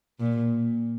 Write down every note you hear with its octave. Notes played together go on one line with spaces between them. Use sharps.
A#2